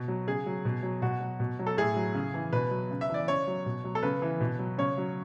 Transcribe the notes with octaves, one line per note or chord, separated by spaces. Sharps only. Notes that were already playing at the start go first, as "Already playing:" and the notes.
Already playing: B2
F#3
C#3 G#4
F#3
B2
F#3
B2 F#4
F#3
B2
F#3
A4
A2 G#4
F#3
C#3
E3
B2 B4
F#3
C#3
E5
E3 D5
C#3 C#5
F#3
B2
F#3
A4
C#3 B4
E3
B2
F#3
C#3 C#5
F#3